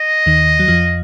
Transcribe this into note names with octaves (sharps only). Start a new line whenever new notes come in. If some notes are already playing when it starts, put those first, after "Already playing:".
Already playing: D#5
D#2 D#3
F#3
F2 F3